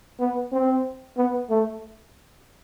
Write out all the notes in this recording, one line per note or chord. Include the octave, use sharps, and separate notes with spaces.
B3
C4
B3
A3